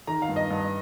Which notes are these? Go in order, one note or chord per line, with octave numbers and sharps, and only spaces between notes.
D#3 A#5
F5
G2
D#5
G2